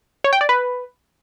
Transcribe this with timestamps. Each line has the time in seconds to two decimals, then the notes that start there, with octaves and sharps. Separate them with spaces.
0.24 C#5
0.33 G5
0.41 D5
0.49 B4